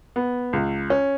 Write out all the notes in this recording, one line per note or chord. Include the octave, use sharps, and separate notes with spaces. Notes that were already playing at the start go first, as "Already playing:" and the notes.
B3
C#2
C#4